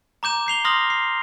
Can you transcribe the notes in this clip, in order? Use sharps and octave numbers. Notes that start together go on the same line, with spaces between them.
A#5 D6 G6 E7
G6 C7 F7 G7
C6 D6 D#6 F6 A#6 G7
C7